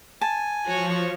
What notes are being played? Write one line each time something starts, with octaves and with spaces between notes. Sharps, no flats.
G#5 A5
F3 F#4 C#5